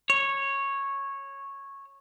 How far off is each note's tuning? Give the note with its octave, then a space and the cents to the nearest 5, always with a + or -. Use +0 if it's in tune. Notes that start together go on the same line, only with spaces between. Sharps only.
C#5 -10